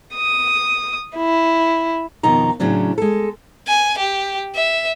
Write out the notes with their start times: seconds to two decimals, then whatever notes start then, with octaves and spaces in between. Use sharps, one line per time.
0.15 D#6
1.16 E4
2.23 F2 B2 D#3 D#4 A#5
2.60 A2 C#3 F#3 C#4 D4
2.98 G#3 A4
3.68 G#5
3.98 G4
4.55 E5